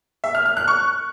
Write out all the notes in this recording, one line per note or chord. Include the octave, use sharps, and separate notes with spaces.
E5
F6
F6
F#6
C#6